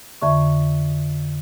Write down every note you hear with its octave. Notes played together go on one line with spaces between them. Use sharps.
F2 D3 E5 C#6